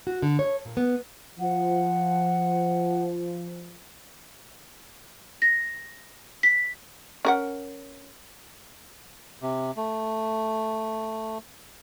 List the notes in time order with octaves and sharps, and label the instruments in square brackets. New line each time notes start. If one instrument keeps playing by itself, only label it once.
[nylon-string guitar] F#4
D3
C#5
A#2
B3
[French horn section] F3 [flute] F#5
[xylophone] A#6
B6
[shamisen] C#4 A#4 F#5
[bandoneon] C3
A3